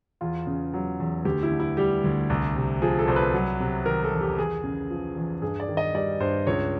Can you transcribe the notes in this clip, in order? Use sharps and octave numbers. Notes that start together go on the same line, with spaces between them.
E2 F4
C#3
F#3
E2
D2 G4
E4
D3
E4
G3 G4
D2
C2
C3
F3 G#4
A4
C2 C5
B4
F#3
C3
D#3 A#4
A4
E2
G4
E2 G#4
C#3
F3
E2
G2 G#4
D5
D#3
D#5
G3 D5
G2 C5
C#2 C#5